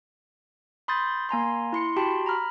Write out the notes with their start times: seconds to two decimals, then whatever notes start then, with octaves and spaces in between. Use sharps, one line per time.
0.88 B5 C6 D#6 G6 A6
1.29 A#3 G#5 A#5 C6
1.73 E4 C6 C#7
1.96 F#4 G4 G5 A5 B5 C6
2.26 A#5 B5 F6